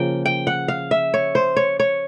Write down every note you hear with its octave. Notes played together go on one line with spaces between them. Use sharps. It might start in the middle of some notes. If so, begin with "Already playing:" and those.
Already playing: C#3 F3 A#3 G5
G5
F#5
F5
E5
C#5
C5
C#5
C#5